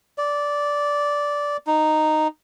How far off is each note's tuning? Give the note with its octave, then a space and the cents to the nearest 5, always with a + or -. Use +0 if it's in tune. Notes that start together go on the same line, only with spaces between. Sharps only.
D5 -10
D#4 -10